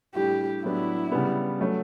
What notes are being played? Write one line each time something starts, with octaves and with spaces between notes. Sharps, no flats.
A2 G3 D4 G4
A2 F#3 B3 D4 E4
C#3 G3 B3
F#3 A3 C#4